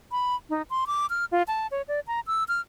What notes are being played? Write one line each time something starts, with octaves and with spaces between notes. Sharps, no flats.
B5
D#4
C6
D6
F6
F4
A5
C#5
D5
A#5
E6
F6